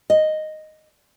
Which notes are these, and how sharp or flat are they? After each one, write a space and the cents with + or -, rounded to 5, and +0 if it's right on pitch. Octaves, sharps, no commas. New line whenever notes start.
D#5 -5